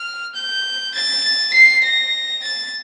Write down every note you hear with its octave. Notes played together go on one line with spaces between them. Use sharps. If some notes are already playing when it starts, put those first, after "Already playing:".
Already playing: F6
G6
A6
C7
A#6
A6